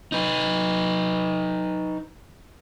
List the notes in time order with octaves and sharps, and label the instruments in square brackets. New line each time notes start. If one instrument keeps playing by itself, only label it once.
[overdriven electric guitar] D#4 B4